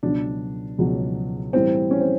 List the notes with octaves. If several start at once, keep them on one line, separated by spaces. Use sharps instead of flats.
C#2 B2 F#3 D4
C#2 B2 F#3
A2 E3 G3 C4
C#4
C4